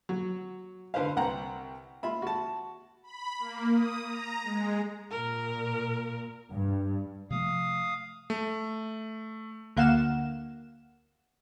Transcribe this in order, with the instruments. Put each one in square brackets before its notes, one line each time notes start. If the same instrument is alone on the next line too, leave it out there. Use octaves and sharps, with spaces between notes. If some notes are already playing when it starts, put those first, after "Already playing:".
[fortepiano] F#3
D3 B4 C5 F5
C2 F#5 G5 A#5
F4 E5 B5
F#4 A5
[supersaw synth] B5
A#3
D#6
A#5
G#3
[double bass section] A#2 [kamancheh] A#4
[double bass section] G2
[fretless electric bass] C3 F3 A3 [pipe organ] F5 D#6
[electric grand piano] A3
[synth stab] D2 A#3 F5 F#5 E7